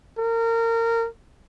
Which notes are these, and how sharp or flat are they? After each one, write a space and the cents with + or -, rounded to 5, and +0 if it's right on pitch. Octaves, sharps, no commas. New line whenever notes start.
A#4 -25